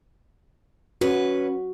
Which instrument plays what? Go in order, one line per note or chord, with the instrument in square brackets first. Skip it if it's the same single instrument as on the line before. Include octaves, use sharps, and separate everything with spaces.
[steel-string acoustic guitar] C#4 B4 [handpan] F#4